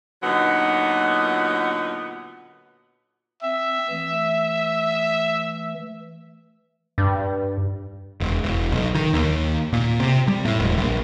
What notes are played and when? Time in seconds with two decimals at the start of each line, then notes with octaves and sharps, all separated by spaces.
0.23 A#2 D3 F#3 B3 D#4 F#5
3.43 C4 E5
3.90 E3 A3
6.98 G2
8.20 E1
8.43 E1
8.72 B1
8.95 D#3
9.14 D#2
9.73 A#2
10.00 C3
10.28 G3
10.45 A2
10.59 E1
10.78 A#1